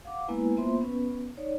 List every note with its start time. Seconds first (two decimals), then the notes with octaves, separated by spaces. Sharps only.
0.05 F5 F#5 D6
0.28 G#3 A#3 B3 E4 B4 G#5
0.57 A#3 B3 F4 C5 E5 C6
0.81 B3 C#4 B4
1.37 D#4 C#5 D5